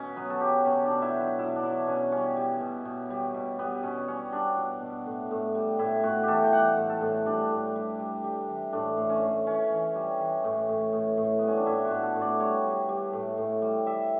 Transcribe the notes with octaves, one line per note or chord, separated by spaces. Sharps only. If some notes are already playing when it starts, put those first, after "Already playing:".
Already playing: B2 C#4
F#3 B3
A4
F#3 G4
B2 C#4
D4
B2
E4
F#3
E4
B2 E4
D4
F#3 E4
B2 C#4
G3 C#4
G3
B2
B2
G3
B2
G3 B3
B2 C#4
G3 C#4
G3 D4
B2
B2
A2
A2
G3
A2 E4
A2 F#4
E3 G4 A4
G5
G3 F#5
A2
A4
A2
G3 D4
A2
G3
G3
G3
E3
A2 D4
A2
C#4
A2
E3 C#4
E3
G3
E3
A2
A2
A2
A2
G3 B3
C#4
D4
A2 E4
F#4
A2
A4
A2
D5
G3 C#5
G3
G3
A2
A2
G3
G3 E5